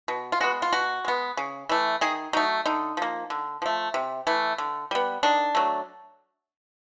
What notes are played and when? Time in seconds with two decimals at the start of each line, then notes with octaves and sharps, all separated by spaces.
0.08 B2
0.32 F4
0.40 G#3 B3 F#4
0.62 F4
0.72 B2 F#4
1.05 G#3 B3
1.37 C#3
1.69 E3 A3
2.01 D#3 G#4
2.33 F#3 A3 D#4
2.66 D3 D#4
2.97 F3 A#3
3.30 D3
3.62 F3 A3
3.94 C3
4.27 E3 A3
4.58 D3
4.91 G3 B3
5.23 D#3 D4
5.55 F#3 A3